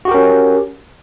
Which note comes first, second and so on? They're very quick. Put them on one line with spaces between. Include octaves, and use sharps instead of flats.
F#4 G4 A#4 C#4